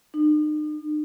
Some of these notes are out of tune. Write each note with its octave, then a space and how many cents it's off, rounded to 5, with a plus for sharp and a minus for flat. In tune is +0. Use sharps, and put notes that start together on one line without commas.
D#4 -45